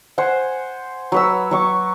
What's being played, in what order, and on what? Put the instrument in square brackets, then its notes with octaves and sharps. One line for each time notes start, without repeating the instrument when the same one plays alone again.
[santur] C5 F#5 G#5
F#3 B4 E6
F#3 C#6 D6